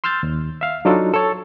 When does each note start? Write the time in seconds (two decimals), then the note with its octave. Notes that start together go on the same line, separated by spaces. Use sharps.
0.04 C6 E6 F6 G6 A6
0.23 D#2
0.61 E5 F5
0.85 F#3 D4 D#4 F4 F#4 A4
1.14 A4 C#5